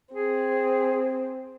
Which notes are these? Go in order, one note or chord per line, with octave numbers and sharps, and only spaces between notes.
C4 G#4